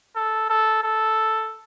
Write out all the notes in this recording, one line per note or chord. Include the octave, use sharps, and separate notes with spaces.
A4
A4
A4